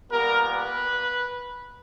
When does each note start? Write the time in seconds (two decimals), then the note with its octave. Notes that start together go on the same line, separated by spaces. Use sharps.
0.11 A#2 G3 B3 A#4
0.52 B4